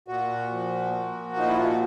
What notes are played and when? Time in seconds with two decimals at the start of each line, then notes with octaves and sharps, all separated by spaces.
0.08 A#2 F#4
0.51 F3
0.93 A#2
1.36 F3 D#4
1.48 E4
1.58 F4
1.68 F#4